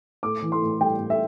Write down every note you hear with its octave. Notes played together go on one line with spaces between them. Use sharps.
A2 D6
E3
C6
A2
G3 G5
A2
E5